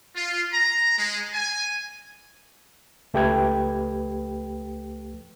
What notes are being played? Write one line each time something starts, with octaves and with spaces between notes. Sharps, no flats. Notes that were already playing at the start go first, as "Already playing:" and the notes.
F4
A#5
G#3
G#5
C#2 A3 G4 B4 G5 G#6